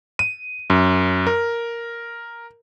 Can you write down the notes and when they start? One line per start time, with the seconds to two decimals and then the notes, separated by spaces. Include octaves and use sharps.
0.19 D#7
0.70 F#2
1.27 A#4